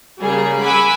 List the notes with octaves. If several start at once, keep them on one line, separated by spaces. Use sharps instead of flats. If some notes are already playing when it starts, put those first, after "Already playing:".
C#3 G3 A#3 G#4
F#5 G#5 B5 D6 E6